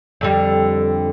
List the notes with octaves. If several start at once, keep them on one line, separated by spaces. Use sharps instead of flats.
F2 D3 G3